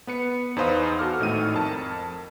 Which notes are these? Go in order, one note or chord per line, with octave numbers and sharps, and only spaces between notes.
B3 B4 C#7
E2 D#4 B4 C5 F5 D#6
F#4 A4 D6 F6
G#1 A2 D#4 D#7
F2 A#4 A5